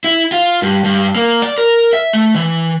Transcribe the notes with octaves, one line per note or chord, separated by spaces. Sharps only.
E4
F4
G2
G2
A#3
D5
A#4
E5
A3
E3